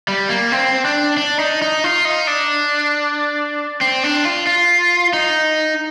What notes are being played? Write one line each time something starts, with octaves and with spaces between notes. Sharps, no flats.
G3
A#3
C4
D4
D4
D#4
D#4
F4
D#4
D4
C4
D4
F4
F4
D#4